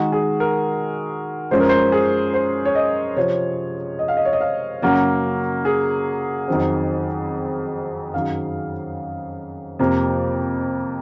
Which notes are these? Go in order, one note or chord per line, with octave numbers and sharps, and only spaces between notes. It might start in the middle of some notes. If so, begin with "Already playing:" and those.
Already playing: D#3 G#3 D#4 F#4
G#4
A#4
F#2 F3 G#3 C#4 C5
A#4
C5
G#4
C5
C#5
D#5
C3 F3 C4 C#5
D#5
F5
D#5
C#5
D#5
F5
F#2 C#3 F#3 A#3 C#4 F#4
G#4
F2 D#3 F#3 C4
F#2 D#3 F#3 F5
F2 C3 F3 A#3